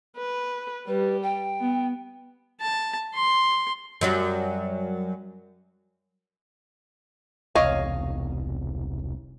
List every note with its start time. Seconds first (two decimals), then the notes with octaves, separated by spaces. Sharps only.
0.17 B4
0.88 G3 B4
1.23 G5
1.61 B3
2.61 A5
3.15 C6
4.01 F#2 F#3 G3
7.55 E1 C2 C#5 D#5 F5